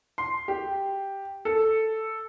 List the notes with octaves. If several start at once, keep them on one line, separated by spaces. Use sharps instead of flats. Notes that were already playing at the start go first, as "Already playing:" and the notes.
C6
G4
A4